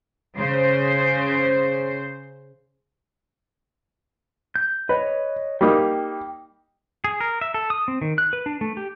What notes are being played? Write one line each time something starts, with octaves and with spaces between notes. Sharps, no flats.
C#3 C5
G6
B4 C#5 D#5
G3 A#3 D#4 G5
G#4
A#4
E5
A4
D#6
C4
D#3
F#6
B4
D4
A3
G4